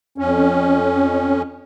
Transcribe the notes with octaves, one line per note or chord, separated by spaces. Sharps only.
F2 C#4